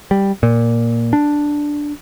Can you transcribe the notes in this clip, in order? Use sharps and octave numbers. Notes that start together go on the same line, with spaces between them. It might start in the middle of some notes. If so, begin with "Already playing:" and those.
G3
A#2
D4